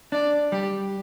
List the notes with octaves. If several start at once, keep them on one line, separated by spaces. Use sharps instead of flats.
D4 D5
G3 G4